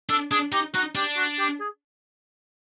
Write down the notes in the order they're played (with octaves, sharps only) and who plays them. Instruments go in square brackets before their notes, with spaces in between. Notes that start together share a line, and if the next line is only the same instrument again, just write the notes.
[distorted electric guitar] D4 [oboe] A4
[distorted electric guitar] D4 [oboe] G#4
[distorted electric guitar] D#4 [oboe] G4
[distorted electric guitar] D#4 [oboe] F#4
[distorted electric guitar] D4 [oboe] G4
[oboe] F#4
G4
G#4